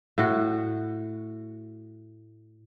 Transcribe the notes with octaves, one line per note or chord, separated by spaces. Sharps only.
A2 F#4